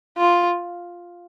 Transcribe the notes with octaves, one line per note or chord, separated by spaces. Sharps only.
F4